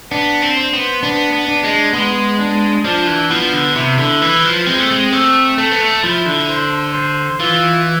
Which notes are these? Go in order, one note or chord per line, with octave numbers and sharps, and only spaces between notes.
B3 D4
C4
C5
B3
B3 D4
B3
D4
G#3
G#3 B3
D4
F3 D4
E3
F3 B3
D3
C3 E4
D3
E3 B4
F3
G#3 C4
A3
G#3
A3 C4
A3 A4
B3
A3
F3 E4
D3
C5
C5
E3 F4